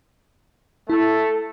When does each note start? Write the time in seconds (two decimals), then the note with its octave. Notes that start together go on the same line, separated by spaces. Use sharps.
0.90 A3 E4 A4